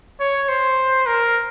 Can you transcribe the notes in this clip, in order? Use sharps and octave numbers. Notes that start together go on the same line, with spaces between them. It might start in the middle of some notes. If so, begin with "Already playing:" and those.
C#5
C5
A#4